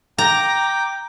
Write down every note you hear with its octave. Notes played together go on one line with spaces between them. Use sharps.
G5 A#5 D6